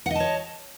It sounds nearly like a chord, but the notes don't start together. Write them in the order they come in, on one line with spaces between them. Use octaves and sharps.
F#5 D#5 A5 C#5